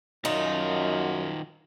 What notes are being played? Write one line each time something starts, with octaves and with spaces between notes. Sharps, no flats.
F#2 D#3 D#4 F4 F#4